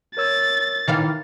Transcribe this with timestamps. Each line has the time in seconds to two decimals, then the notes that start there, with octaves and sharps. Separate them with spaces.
0.17 A#4 C#5 E6 A6
0.88 D#3 E3 F5 A6